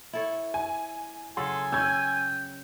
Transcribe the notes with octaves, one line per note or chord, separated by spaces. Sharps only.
E4 A4 C#5
G#5
C#3 F#3 A4 G#5 C6
C#4 G5 E6 G#6